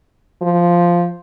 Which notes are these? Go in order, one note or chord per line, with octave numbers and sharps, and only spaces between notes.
F3